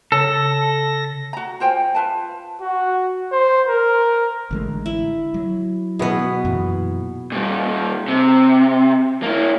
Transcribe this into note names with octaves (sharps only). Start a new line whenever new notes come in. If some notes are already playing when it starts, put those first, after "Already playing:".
C#3 A4 A#6
F#4 A#5
F4 C5 G5 G#5
F4 B4 A5
F#4
C5
A#4
A1 D3 G#3
E4
F#3
B2 B3 E4 G#4
F#2 A#2 E3
A#2 G3
C3
A#3 E4